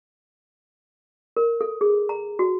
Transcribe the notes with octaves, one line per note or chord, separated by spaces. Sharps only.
A#4
A4
G#4
A#5
F#4